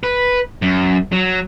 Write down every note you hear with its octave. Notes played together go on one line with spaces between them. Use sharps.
B4
F#2
F#3